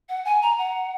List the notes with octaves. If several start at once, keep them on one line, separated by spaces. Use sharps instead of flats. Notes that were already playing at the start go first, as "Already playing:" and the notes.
F#5
G#5
A#5
F#5